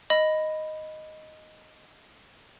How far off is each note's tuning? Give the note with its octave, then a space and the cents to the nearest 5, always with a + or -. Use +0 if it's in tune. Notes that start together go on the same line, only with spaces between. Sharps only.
D#5 +0 B5 +0